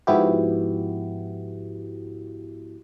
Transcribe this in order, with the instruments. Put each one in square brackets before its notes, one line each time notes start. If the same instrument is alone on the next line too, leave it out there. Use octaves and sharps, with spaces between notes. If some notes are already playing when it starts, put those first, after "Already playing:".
[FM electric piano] G#2 F3 B3 E4 F#4 G4